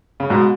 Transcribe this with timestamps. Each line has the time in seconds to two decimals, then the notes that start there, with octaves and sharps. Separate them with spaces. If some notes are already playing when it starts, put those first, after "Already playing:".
0.20 C#3
0.30 G#2 B2